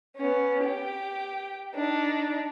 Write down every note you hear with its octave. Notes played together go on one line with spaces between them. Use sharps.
B3 C#4
G4 G5
D4 D#4